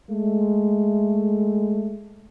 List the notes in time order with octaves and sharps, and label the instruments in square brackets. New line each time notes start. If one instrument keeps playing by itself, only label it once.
[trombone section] G#3 A3